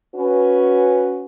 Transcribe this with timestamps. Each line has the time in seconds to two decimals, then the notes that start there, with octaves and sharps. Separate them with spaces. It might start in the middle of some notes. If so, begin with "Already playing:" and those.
0.16 C#4 F#4 B4